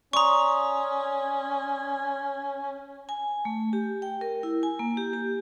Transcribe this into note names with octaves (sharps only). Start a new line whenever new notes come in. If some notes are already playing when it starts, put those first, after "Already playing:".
C#4 D5 A#5 C6 C#6 D#6
G#5
A3
G4
G5
A#4
E4
G#5
A#3
G4
G4